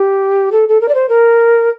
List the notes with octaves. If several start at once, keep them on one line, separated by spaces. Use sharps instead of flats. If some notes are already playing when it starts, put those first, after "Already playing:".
Already playing: G4
A4
A4
A#4
D5
C5
A#4